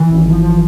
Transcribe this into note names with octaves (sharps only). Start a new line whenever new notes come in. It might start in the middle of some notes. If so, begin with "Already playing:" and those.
Already playing: E3
G#1
F3
F3